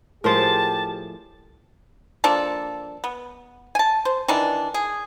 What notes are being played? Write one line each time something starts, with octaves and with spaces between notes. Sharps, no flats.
A2 F3 G#3 G4 A#4 C5 A5
F3 A#3 D4 A4
B3
G#5 A5
C5
D#3 E3 D4
G#4